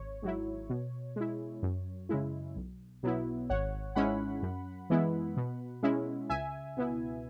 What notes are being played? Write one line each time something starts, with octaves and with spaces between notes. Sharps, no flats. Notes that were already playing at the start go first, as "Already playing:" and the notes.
Already playing: G#1 C#5
G#2 F#3 E4
B2
G#3 E4
F#2
C#3 G#3 E4
B1
B2 F#3 B3 E4
G#1 C#5 F#5
G#2 G#3 C#4 E4 F#5 B5
F#2
E3 G#3 B3 E4
B2
G#3 C#4 E4
C#2 E5 G#5
B2 B3 E4